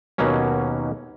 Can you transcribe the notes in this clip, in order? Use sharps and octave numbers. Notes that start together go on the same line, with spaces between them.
D#2 B2 F#3 A#3 C#4